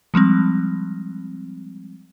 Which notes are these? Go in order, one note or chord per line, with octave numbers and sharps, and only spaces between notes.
F3 G3 G#3 C4